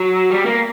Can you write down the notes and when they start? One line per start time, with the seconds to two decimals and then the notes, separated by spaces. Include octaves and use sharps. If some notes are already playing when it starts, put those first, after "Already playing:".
Already playing: F#3
0.30 G3
0.46 A#3